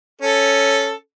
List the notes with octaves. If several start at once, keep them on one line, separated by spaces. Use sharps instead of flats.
C#4 A4